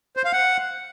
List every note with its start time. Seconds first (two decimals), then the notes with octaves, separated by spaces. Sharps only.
0.17 C5
0.25 F5
0.33 F#5